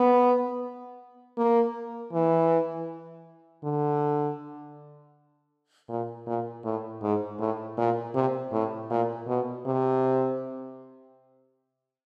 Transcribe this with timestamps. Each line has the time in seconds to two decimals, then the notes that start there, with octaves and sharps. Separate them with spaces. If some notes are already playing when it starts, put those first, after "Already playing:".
Already playing: B3
1.38 A#3
2.13 E3
3.64 D3
5.89 A#2
6.27 A#2
6.64 A2
7.02 G#2
7.39 A2
7.78 A#2
8.15 C3
8.52 A2
8.91 A#2
9.28 B2
9.66 C3